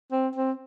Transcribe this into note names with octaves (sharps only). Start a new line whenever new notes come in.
C4
C4